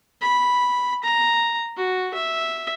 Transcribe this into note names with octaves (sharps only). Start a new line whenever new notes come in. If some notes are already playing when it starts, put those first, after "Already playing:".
B5
A#5
F#4
E5